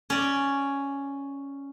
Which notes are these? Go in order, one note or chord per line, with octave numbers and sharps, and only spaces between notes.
C#4 D5